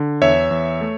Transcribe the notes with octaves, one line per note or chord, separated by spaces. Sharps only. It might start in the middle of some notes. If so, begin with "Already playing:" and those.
Already playing: D3
E2 C#5 E5
E2
A3